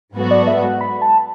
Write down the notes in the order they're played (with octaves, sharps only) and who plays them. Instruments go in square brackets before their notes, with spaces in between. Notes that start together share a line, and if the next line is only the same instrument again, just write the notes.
[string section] G#2 F#3 B3 F#4 A4
[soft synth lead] D5
E5
F#5
B5
A5